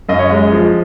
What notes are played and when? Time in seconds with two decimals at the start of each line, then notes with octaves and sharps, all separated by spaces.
0.09 F#2 D#5
0.19 C#5
0.30 G#3 D#5
0.52 F3